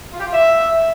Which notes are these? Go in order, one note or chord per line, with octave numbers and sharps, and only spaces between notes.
F4
G4
F4
E5